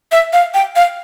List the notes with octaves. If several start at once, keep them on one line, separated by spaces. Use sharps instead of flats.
E5
F5
G5
F5